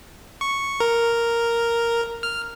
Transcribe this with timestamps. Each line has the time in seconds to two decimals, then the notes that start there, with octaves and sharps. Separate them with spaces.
0.41 C#6
0.80 A#4
2.23 F6